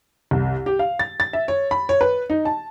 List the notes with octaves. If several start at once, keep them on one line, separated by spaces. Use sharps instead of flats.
C2
G4
F5
A6
A6
E5
C#5
B5
C#5
B4
D#4
A5